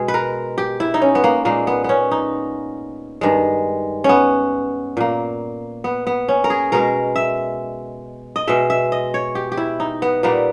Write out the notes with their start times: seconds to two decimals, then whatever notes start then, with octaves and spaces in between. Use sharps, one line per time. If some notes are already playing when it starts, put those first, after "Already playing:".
Already playing: B2 G#3 G#4
0.08 B4
0.14 A#4
0.58 G4
0.80 E4
0.94 D#4
1.02 C#4
1.15 B3
1.24 A#3
1.45 A#2 G#3 A#3
1.67 B3
1.84 B3 C#4
2.11 D#4
3.21 G2 D#3 G#3
4.04 B3 C#4
4.97 A#2 A#3
5.84 B3
6.07 B3
6.28 C#4
6.44 A#4
6.50 G#4
6.72 B2 G#3 A#4
7.16 E5
8.36 D#5
8.47 B2 G#3 E5
8.70 E5
8.92 D#5
9.14 C#5
9.35 G4
9.52 G4
9.57 E4
9.80 D#4
10.02 B3
10.23 A#2 G3 A#3 B3